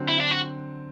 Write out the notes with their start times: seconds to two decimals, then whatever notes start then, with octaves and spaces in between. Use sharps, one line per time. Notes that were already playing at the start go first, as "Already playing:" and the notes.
Already playing: D3 F#3 C4
0.08 E4
0.20 D4
0.31 F#4